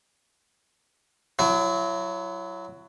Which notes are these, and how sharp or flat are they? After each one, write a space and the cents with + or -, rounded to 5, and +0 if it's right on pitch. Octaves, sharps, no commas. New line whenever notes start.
F#3 +0 E4 +35